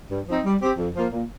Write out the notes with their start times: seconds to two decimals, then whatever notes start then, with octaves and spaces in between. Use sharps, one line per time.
0.10 G2
0.27 F3 C4 D#4
0.45 G3
0.61 C4 G4
0.78 F2
0.95 F3 A#3 F4
1.12 A#2